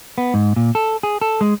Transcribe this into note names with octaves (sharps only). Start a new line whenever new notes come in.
B3
G#2
A#2
A4
G#4
A4
G#3